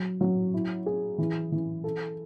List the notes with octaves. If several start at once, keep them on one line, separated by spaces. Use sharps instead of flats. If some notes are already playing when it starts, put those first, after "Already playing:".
Already playing: F#3
F#3
E4
G#4
E3
E3
A4